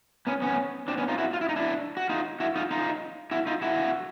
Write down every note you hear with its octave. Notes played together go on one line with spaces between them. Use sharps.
B3 C#4
B3 C#4
C4 D4
B3 C#4
D#4 F4
E4 F#4
F4
E4
D#4
D4 E4
F#4
D#4 F4
E4 F#4
D#4 F4
D#4 F4
E4 F#4
D#4 F4
E4 F#4